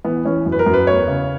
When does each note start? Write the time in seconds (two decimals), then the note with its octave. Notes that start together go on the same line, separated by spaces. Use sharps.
0.04 E3 B3
0.25 E3 C#4
0.46 F#2
0.52 B4
0.59 A#4
0.66 F#2
0.74 B4
0.87 E2 C#5
1.07 C#3